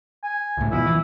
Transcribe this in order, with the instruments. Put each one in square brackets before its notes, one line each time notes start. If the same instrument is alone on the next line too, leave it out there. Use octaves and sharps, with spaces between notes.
[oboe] G#5
[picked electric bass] C#2 A2
[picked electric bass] D2 B2 F3 [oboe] E4
[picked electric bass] E3